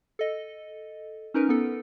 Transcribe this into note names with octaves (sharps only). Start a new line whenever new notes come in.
A4 D#5
C#4 D#4 A#4 B4
B3 A4